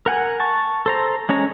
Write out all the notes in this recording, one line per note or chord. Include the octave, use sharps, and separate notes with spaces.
A#4 F#5 G#5
A5 C#6
A4 C5 A#5
G#3 C#4 C#5 A#5